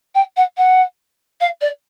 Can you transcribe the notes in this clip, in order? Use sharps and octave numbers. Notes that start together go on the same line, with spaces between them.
G5
F#5
F#5
F5
D5